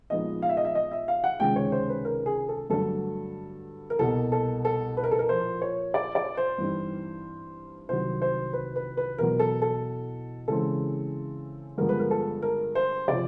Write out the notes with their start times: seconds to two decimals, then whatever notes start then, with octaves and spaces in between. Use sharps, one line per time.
0.10 A#2 F3 G#3 B3 D#4 D#5
0.42 F5
0.49 E5
0.57 D#5
0.65 E5
0.75 D#5
0.91 E5
1.08 F5
1.24 F#5
1.40 C#2 C3 D#3 G#3 C#4 G5
1.56 C#5
1.72 C5
1.89 B4
2.05 A#4
2.26 G#4
2.49 A4
2.70 G2 D3 F#3 A3 D4 A4
3.90 A#4
3.99 C2 B2 G3 A#3 A4
4.32 A4
4.65 A4
4.97 B4
5.04 A#4
5.11 A4
5.19 A#4
5.29 A#2 F3 A#3 C5
5.62 C#5
5.94 D5
6.15 D5
6.37 C5
6.58 G2 E3 G3 C4 D#4
7.89 C2 C3 D#3 F#3 C5
8.22 C5
8.53 B4
8.76 B4
8.97 B4
9.18 E2 B2 F#3 A#4
9.39 A4
9.62 A4
10.48 C#3 E3 G#3 C4 A4
11.78 G2 D3 F3 G#3 B3 A#4
11.89 B4
11.99 A#4
12.11 A4
12.42 A#4
12.75 C5
13.08 C3 F3 D5